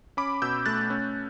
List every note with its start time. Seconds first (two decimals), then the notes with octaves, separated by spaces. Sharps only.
0.17 C#4 B5 D6
0.42 B2 E6 G6
0.65 A3 F#6 A6
0.90 C#4